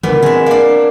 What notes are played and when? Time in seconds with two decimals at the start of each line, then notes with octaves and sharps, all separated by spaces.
0.03 A#2 D3 E3 B3
0.22 G#3 C4 E5
0.46 A#3 D4